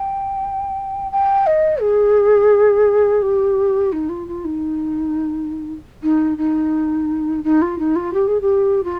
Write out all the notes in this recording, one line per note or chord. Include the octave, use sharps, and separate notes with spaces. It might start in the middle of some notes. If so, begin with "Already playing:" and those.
Already playing: G5
G5
D#5
G#4
G4
D#4
F4
F4
D#4
D#4
D#4
D#4
F4
D#4
F4
G4
G#4
G4
F4